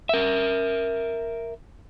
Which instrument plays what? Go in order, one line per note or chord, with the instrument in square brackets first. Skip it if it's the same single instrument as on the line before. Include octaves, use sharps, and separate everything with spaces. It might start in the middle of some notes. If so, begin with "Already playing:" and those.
[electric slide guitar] A#4 E5